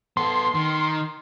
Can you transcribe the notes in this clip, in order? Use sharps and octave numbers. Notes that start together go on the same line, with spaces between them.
B3 A4 C6
D#3